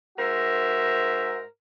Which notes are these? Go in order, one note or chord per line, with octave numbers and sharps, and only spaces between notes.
G#2 F#4 A#4 C5 E5